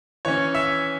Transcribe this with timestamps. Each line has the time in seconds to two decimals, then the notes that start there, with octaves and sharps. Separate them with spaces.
0.25 E3 C#4 C#5
0.55 E5